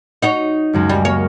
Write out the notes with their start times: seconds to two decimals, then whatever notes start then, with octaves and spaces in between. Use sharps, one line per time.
0.22 D#4 F#4 C#5
0.73 C#2 F#2 G#3
0.89 G3
1.05 A#3 C#5